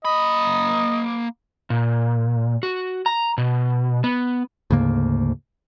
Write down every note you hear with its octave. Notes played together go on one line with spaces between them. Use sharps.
A#3 D#5 B5
A#2
F#4
A#5
B2
B3
D2 G#2 C#3 A#3